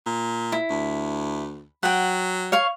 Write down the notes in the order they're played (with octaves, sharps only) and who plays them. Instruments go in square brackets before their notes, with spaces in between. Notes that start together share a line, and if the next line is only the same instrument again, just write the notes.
[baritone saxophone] A#2
[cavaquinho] E4
[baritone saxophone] D2
[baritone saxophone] F#3 [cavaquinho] F#5 G5
[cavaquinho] C#5 F5 C#6